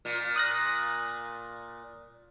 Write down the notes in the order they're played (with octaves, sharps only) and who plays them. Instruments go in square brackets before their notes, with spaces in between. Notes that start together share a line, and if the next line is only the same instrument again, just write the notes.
[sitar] A#2
[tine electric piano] D#6 F#6 A#6